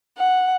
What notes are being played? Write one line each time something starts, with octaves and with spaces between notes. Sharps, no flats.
F#5